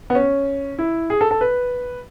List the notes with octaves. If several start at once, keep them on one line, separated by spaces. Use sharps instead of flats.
B3
C#4
E4
G#4
A4
A4
B4